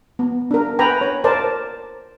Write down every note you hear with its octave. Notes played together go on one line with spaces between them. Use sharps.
B3
D4 A#4
B4 G5 G#5 A#5 B5
C#5
A#4 C5 D5 A5